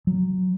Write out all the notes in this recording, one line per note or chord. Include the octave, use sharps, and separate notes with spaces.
F#3